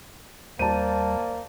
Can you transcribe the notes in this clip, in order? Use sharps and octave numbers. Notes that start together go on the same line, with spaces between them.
D#2 G3 A#3 C5 D5 A5 D#7